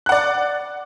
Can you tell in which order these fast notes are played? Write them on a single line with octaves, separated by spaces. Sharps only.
F#6 F#5 D5